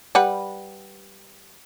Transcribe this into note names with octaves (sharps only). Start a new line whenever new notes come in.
G3 B4 F#5